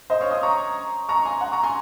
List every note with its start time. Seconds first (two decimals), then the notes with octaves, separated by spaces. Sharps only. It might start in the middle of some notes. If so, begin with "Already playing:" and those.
0.10 C5 D#5
0.20 C#5 F5
0.31 C6 D#6
0.43 A#5 C#6
1.09 A#5 C#6
1.25 G#5 C6
1.41 F#5 A#5
1.52 A#5 C#6
1.63 G#5 C6